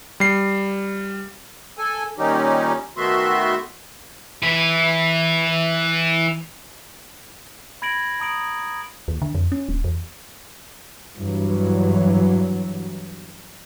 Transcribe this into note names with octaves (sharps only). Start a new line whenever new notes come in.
G3 C7
A4 G#5
A#2 D#3 G3 C#4 D#4 G4
D#3 A3 B3 F#4 E5 C6
E3 B4
B5 G#6 A#6 D7 F#7
A#5 D#6 D7 F#7
D#2
D3
F2
C#4
D1
E2
G2 E3 F#3